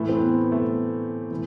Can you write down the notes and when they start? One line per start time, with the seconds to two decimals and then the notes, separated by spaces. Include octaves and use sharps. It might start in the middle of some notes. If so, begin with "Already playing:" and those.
Already playing: A2 E3 A3
0.09 C4
0.16 B3
0.52 A3
0.62 B3
1.31 E3